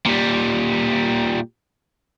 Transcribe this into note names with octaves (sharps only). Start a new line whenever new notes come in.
A#2 G3